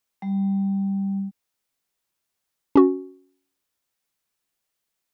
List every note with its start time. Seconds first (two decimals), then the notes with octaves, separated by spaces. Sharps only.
0.22 G3
2.75 C#4 F#4